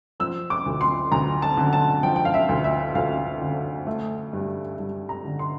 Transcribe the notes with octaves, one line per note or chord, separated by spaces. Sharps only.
F3 E6
D6
D2
C6
D2 A#5
A5
D3
A5
F3 G5
G5
F5
E5
D2
E5
D2 F5
D3
A3
G2
G2
A#5
D3
C6